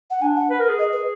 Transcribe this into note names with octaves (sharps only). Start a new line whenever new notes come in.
F#5
D4 G#5
F#5
B4
A#4
G#4
D#5
B4